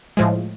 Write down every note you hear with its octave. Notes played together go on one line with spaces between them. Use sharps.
A2 F3 G#3